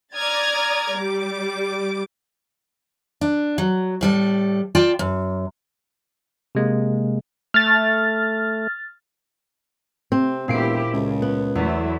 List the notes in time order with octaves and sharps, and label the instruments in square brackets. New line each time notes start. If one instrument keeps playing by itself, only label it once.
[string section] D5 A#5 D#6 F6 G#6 A6
G3 D6
[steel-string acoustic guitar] D4
F#3
A2 G3 A4
F4 D5 G5 A5
F#2
[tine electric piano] C3 G#3 A#3
[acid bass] A3 [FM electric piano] F6 A6
[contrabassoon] C3 [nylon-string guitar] C4
[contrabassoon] E1 [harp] A#2 C7 D7 [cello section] E4 G4
[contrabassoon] C#2 [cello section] C#3
[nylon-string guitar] B3
[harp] E2 [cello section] F#3 A3 E4